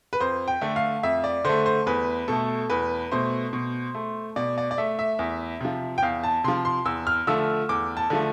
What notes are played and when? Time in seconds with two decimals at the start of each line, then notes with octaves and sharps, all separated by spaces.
0.13 B4
0.20 F2 C5
0.48 G5
0.61 D3 A3
0.76 F5
1.03 F2 E5
1.24 D5
1.45 D3 A3 C5
1.66 C5
1.87 E2 B4
2.28 B2 A3 A4
2.70 E2 B4
3.11 B2 A3 C5
3.53 B2
3.95 A3
4.36 B2 D5
4.58 D5
4.71 D5
4.78 A3 E5
4.99 E5
5.19 E2
5.60 C3 F3
5.98 G5
6.02 E2 F5
6.23 A5
6.44 C3 F3 C6
6.65 C6
6.85 E2 E6
7.07 F6
7.27 D3 F3 A3 E6
7.69 E2 D6
7.97 A5
8.10 D3 F3 A3